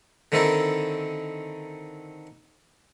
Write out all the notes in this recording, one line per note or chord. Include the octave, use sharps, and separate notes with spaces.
D3 D#3 C4 E4 A4 A#4